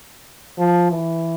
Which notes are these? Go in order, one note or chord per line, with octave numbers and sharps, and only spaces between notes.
F3
E3